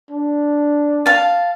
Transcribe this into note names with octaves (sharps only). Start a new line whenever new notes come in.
D4
F5 A5